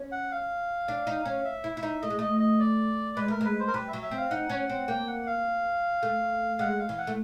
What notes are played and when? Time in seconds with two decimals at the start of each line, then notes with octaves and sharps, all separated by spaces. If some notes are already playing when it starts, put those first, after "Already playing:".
Already playing: C#4
0.12 F#5
0.31 F5
0.88 D4
1.07 D#4
1.25 C#4
1.45 E5
1.64 E4
1.77 E4
1.83 D#4
2.02 A3 D#5
2.10 G#3
2.19 A3 D#5
2.40 D#5
2.60 D5
3.16 G#3 B4
3.28 A3 A#4
3.41 G#3 B4
3.60 C5
3.68 A#4
3.74 G3 B4
3.88 E5
3.93 F#3
4.02 E5
4.11 C4
4.17 F5
4.30 D#4 F#5
4.49 C#4
4.70 C4
4.88 A#3 G5
5.07 F#5
5.27 F5
6.03 A3
6.59 G#3 F#5
6.79 F5
6.89 E3
6.98 F#5
7.07 A3